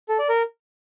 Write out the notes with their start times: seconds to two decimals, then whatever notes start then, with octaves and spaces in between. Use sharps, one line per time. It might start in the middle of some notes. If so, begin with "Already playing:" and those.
0.09 A4
0.19 D5
0.29 A#4